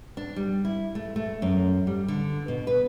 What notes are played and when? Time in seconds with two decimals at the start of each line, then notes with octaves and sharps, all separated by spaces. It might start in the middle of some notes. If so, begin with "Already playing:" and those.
0.17 D4
0.36 G3
0.65 E4
0.95 A3
1.16 A3
1.42 F#2
1.87 G3
2.08 D3
2.48 B2
2.67 B4